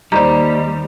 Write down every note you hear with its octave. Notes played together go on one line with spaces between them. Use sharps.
D#2 G3 D#4 C5 D5 A#5 G6